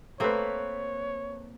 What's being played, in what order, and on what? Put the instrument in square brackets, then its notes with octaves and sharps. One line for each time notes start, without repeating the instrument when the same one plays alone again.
[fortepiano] A3 B4 [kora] A#3 C4 [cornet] C#5